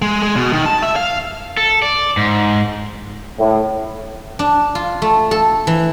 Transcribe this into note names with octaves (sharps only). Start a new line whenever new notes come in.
G#3
G#3
B2
D#3
A5
E5
F5
A4
D5
G#2
A2
D4
F4
A3
A4
E3